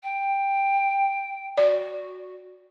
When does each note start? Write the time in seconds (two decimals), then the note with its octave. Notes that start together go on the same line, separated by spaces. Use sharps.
0.03 G5
1.58 F#4 D5